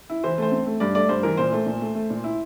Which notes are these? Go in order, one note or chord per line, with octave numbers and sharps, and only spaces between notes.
E4
E3 C5
A3 C5
C4
A3
G2 D5
A3 D5
G2 C5
E3 A#4
A#2 C5
A3
A#2
A3
A3
A#2
E4